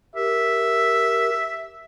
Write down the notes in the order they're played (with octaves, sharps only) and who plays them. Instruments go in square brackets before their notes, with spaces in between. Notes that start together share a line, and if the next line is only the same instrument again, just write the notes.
[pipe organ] G4 A#4 [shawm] E5